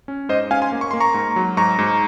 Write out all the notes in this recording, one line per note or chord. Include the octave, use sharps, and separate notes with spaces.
C#4
G#2 C5 D#5
C#4 F5 G#5
G#5 C6
A#3
C#6
A#3 C6
A#5 C#6
G#2
F#3
G#2 A#5 C#6
G#2